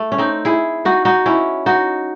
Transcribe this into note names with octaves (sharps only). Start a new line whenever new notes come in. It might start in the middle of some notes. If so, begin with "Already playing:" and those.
Already playing: A3
C#4
C4 D#4
E4 G#4
D#4 F#4
D#4 F#4
C#4 E4
D#4 F#4